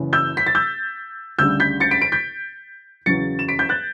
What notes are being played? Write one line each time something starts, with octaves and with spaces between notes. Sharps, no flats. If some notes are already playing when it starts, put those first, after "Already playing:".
Already playing: F#1 F#2 E3
E6 G6
B6
A6
E6 G6
D2 C#3 G3 E6 G6
G6 B6
A6 C#7
B6 D7
B6 D7
G6 B6
E2 C#3 F#3 A6 C#7
E7
B6 D7
G6 B6
F#6 A6